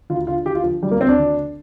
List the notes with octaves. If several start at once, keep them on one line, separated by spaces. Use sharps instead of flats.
D2 F4
D3 F4
D2 G4
F4
D3 F3
D2 G3
A#3
D3 C4
D4
D2
D3